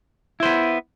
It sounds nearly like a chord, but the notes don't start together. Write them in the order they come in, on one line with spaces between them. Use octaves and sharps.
E4 C5 B3